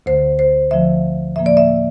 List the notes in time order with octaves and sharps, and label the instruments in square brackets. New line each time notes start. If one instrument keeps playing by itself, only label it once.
[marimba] D2 D3 A3 C5
C5
D2 D3 F3 A3 E5
A2 F3 A#3 E5
D5
E5